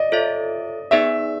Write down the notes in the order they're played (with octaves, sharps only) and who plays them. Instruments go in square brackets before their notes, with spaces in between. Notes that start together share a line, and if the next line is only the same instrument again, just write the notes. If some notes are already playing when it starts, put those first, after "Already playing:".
Already playing: [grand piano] D5 D#5
[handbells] F4 A4 C#5 E5
[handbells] B3 D#4 G#4 B4 D5 [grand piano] E5